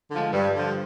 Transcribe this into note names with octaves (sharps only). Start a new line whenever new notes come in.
D3
F3 G#3
G2 G3
D3 F3